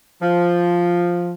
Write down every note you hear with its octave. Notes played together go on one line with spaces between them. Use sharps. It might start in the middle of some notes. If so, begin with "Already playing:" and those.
F3